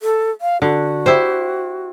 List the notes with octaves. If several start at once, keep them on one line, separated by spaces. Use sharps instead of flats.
A4
F5
D3 F#4
E4 G4 C5